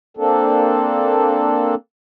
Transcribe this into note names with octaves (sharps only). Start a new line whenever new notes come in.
A#3 C4 D4 A4